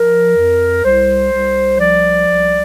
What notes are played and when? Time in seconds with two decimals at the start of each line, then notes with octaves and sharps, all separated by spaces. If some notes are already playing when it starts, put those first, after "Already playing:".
Already playing: F3 A#4
0.36 F2
0.83 C2 C5
1.32 C2
1.79 F3 D5
2.26 C2